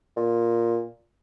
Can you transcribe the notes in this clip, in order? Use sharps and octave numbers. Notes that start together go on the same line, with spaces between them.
A#2